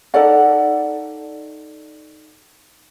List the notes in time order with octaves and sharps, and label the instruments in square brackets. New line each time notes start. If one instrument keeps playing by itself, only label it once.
[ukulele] D#4 A4 D5 F#5